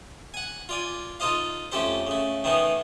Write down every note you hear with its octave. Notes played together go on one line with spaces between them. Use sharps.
F#5 G#5
F4 D5 G#5
D#4 F4 A4 C5 D#5 F5
F2 A3 C#4 G4 A4 C5
C#3 A3
D#3 E3 A3 B3 D#4